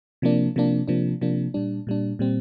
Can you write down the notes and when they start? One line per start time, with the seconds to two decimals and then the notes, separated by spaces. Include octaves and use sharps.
0.22 C3 F3 A#3 D4
0.56 C3 F3 A#3 D4
0.88 C3 F3 A#3 D4
1.21 C3 F3 A#3 D4
1.54 A#2 G3 D4
1.87 A#2 G3 D4
2.19 A#2 G3 C4